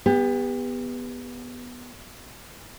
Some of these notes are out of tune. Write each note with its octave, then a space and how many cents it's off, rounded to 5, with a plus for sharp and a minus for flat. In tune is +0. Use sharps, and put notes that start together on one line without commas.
B3 -5 G4 +35